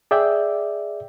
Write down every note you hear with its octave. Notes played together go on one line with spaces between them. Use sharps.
G#4 D5 E5 G5